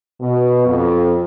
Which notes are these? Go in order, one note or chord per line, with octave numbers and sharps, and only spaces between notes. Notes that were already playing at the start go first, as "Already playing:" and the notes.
B2
F2